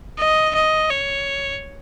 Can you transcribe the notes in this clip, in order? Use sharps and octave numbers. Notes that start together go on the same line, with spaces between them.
D#5
D#5
C#5